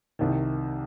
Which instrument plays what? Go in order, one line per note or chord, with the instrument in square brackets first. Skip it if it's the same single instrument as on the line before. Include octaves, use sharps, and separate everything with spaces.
[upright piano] C2 C3 D#3